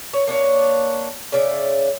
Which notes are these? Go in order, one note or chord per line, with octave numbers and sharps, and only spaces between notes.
C#5
A#3 D4 C#5
C#3 D5 E5